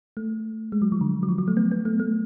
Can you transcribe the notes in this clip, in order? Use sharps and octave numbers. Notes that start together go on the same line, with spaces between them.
A3
G#3
F#3
F3
D3
F#3
F3
F#3
A3
B3
B3
A3
A3